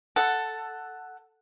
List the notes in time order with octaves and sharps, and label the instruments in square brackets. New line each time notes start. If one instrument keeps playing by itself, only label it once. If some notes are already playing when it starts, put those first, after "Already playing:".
[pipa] A4 [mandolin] F#5